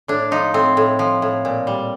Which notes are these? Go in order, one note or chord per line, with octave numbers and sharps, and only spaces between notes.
A2 D4
F3 D#4
A2 C4
A2
F3
A2
A#2
G3